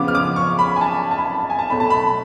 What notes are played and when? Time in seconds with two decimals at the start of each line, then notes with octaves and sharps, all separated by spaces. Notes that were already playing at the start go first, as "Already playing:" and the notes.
Already playing: C#3 F3 B3 D6
0.08 F6
0.15 D6
0.36 C#6
0.59 B5
0.76 G#5
0.81 A5
1.11 A5
1.18 B5
1.25 A5
1.41 A5
1.50 G#5
1.59 A5
1.70 B2 A3 C#4 B5
1.80 A5
1.90 B5